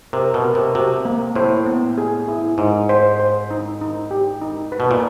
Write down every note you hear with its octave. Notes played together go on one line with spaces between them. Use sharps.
C3 A#4
B2
A#4
C3
C3 F#4
A#3
A2 C5
B3
G#4
E4
G#2 D#4
C5
C5
D#4
D#4
G4
D#4
B4
B2
A#2